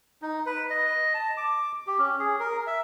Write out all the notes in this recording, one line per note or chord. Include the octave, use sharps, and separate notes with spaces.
D#4
B4
D#5
A5
D6
G4
C#4
G#4
A#4
E5